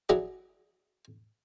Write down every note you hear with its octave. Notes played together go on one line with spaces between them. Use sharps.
F#3 D4 E4 G#4 F#5